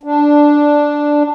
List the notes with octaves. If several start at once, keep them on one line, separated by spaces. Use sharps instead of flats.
D4